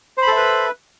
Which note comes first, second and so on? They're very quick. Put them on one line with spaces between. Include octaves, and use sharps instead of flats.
C5 B5 A4 E5 B4